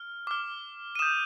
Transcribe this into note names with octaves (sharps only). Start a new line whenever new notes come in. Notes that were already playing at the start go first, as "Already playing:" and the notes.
Already playing: F6
D6 F6
D#7
D#6 G6 E7